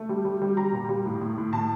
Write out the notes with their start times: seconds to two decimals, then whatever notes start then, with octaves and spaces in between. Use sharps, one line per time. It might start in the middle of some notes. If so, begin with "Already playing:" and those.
Already playing: A3
0.09 G3
0.25 G3
0.42 G3
0.57 G3 A#5
0.73 A#2
0.89 G3
1.06 A2
1.21 A2
1.38 A2
1.53 A2 A5